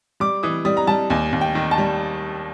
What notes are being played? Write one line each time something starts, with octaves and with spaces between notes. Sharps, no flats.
G3 D6
E3 D#6
G3 D#6
A#5
G3 A5
D#2 G#5
D#2
G5
D#3
A5
G3